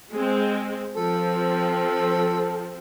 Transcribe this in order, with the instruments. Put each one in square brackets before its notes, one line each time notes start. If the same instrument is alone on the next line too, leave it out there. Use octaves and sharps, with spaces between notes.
[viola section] G#3 C4
[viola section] F3 C4 [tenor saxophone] A4